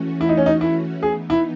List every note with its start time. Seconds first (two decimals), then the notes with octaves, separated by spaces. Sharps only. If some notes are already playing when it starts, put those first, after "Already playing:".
Already playing: E3 A3 C#4 F#4
0.21 E4
0.29 D#4
0.37 C#4
0.46 D#4
0.61 E4
1.02 E3 B3 D#4 G#4
1.30 E4